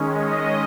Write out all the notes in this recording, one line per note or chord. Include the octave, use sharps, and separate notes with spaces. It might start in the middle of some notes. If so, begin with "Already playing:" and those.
Already playing: D#3 G#3 C#4
D#5